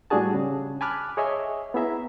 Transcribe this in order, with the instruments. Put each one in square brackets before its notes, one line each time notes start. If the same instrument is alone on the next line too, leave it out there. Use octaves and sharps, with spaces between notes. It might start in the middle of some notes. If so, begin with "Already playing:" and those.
[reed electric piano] A2 G3 D4 F#4 G#4 A5
C#3
G#5 A5 B5 D6 F6 F#6
G#4 C#5 D#5 E5 G#5
B3 E4 G#4 E5 A#5